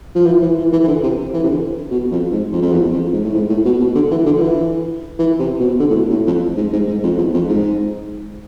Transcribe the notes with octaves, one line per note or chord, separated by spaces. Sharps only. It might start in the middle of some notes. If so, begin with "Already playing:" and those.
F3
E3
E3
E3
E3
E3
D3
C3
E3
C3
D3
B2
F2
G#2
F2
F2
E2
F2
G#2
A2
G#2
A2
B2
B2
D3
E3
D3
F3
E3
E3
C3
B2
D3
A2
B2
A2
F2
G#2
G#2
G#2
F2
E2
F2
G#2